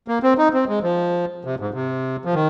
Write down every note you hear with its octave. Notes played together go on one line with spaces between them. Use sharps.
A#3
C4
D#4
C4
G#3
F3
C3
G#2
C3
F3
D#3